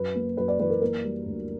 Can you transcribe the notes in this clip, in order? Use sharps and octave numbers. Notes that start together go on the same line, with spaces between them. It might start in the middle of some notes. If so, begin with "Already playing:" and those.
Already playing: F#2 B4
A#3
F#2 B4
D5
E3 B4
A#4
A#3 A#4
G3
D2